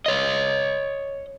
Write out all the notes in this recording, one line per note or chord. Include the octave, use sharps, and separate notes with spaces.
C#5 D#5